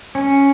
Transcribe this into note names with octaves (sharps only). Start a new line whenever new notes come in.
C#4